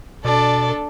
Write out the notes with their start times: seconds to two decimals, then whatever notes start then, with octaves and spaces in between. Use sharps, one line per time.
0.25 B2 D4 A4 D5